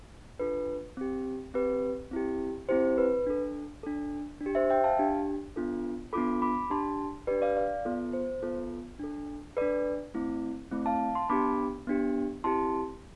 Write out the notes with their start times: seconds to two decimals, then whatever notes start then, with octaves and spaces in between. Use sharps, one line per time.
0.39 D4 F4 A4 B4
0.97 C4 G4
1.54 C4 G4 B4
2.11 C4 E4 G4
2.69 C4 E4 G4 C5
2.98 B4
3.27 D4 A4
3.83 D4 A4
4.41 D4
4.46 G4
4.55 C5 E5
4.70 E5 G5
4.84 F5 A5
4.99 D4 G4
5.56 B3 D4 F4 A4
6.13 B3 D4 F4 A4 B5 D6
6.42 B5 D6
6.70 D4 G4 A5 C6
7.27 G4 B4 D5
7.31 D4
7.42 D5 F5
7.57 D5 F5
7.85 B3 F4 A4
8.13 C5
8.42 B3 F4 A4
8.99 D4 A4
9.57 D4 A4 B4 D5
10.14 A3 C4 E4
10.72 A3 C4 E4
10.86 F5 A5
11.15 A5 C6
11.29 B3 D4 G4 B5 D6
11.87 B3 D4 G4
12.44 C4 E4 G4 A5 C6